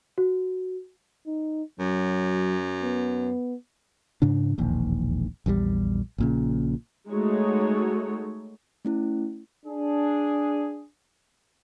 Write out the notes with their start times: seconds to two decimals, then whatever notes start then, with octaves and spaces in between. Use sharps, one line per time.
0.18 F#4
1.26 D#4
1.79 F#2 F#3
2.83 B3
4.22 G#2 C#3 D4
4.58 E1 A#1 D#2
5.46 A#1 E2 D#3 G3
6.18 A#1 A#2 C#3
7.10 G#3 A3 D#4 F#4 C#5
8.85 A3 C#4 E4
9.66 D4 G#4